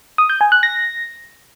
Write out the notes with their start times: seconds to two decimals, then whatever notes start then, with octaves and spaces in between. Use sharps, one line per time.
0.18 D#6
0.30 G6
0.41 G#5
0.52 F#6
0.63 A#6